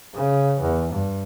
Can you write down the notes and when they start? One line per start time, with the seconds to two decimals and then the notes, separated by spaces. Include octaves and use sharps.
0.15 C#3
0.61 E2
0.93 G2